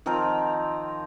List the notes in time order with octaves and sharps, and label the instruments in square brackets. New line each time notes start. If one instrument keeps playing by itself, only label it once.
[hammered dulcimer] D#3 F3 C4 A#4